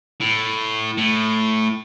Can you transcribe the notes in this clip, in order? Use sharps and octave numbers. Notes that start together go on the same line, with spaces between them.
A2
A2